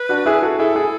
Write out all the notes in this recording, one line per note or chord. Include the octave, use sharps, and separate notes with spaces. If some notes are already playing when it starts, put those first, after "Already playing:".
Already playing: B4
D4 F#4
E4 G#4
F#4 A4
E4 G#4 A4
E4 G#4